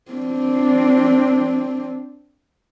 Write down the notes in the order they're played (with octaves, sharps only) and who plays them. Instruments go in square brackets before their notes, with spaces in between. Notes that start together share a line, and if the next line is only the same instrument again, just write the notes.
[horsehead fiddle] C4 D4